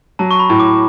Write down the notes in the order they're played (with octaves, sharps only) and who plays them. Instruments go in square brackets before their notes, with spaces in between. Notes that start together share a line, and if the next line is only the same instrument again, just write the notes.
[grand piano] F#3 [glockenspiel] A5
[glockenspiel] C#6
B5
[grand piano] A2
[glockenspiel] D6